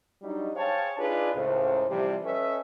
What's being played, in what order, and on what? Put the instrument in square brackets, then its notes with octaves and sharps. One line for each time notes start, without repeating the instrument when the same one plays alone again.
[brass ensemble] F#3 G3 D4 D#4
G#4 C5 C#5 F5 G5 A5
D4 D#4 F4 G#4 B4 D5
C#2 A2 C5
C3 E3 F3 G3
C#4 A4 B4 C#5 D#5 E5